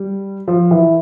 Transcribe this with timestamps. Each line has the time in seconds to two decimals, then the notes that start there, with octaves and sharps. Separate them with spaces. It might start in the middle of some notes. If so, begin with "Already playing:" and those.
Already playing: G3
0.48 F3
0.71 E3